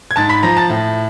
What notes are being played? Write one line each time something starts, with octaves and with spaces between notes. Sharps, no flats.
G#6
G#2 A5 A6
B5 B6
F3 A#5 A#6
A5 A6
A2